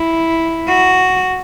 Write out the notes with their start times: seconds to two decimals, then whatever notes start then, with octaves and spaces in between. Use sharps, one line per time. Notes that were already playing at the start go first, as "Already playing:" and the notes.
Already playing: E4
0.68 F#4